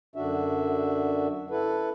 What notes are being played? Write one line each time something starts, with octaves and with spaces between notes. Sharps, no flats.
F#2 D3 D4 F#4 E5
E4 A4 B4